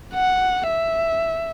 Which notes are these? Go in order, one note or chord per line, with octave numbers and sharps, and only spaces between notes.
F#5
E5